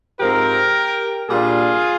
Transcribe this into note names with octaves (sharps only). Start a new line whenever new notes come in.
G#2 F3 C4 G4 A#4
A#2 G3 D4 F4 G#4